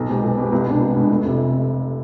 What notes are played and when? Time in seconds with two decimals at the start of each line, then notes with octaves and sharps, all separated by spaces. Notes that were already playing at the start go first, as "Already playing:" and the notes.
Already playing: B1
0.09 B2 G#3 C4 G4
0.23 B1
0.37 B2 G#3 C4 G4
0.52 C2
0.67 B2 G#3 D4
0.81 C2
0.96 B2 G#3 D4
1.10 F1
1.25 F2 C3